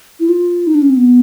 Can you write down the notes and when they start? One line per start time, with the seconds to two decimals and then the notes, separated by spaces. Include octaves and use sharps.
0.20 E4
0.29 F4
0.67 D#4
0.75 D4
0.82 C#4
0.90 C4
0.97 B3